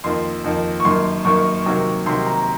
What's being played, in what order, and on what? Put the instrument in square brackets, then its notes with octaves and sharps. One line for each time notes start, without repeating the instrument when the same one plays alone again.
[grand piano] F2 D#3 A#3 C6
F2 D#3 A#3
C#6
F#2 D#3 A#3 C6
F#2 D#3 A#3 C#6
C3 D#3 F#3 A#3
C3 D#3 F#3 A#3 C6
A#5